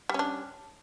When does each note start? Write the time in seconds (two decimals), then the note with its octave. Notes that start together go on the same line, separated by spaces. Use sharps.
0.09 G3
0.14 C#4
0.19 D4